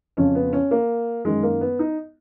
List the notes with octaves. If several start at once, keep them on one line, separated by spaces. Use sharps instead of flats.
F2 C#3 C#4
B3
C#4
A#3
F#2 D#3 G#3
A#3
B3
D#4